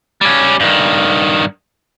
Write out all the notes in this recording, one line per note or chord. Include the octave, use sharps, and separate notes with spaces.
G3 C#4
G2 D#3